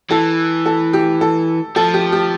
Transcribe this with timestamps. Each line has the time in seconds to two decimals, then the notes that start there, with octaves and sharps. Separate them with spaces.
0.10 E3 A4
0.66 A4
0.93 G4
1.21 A4
1.76 F3 A4
1.94 G4
2.12 G4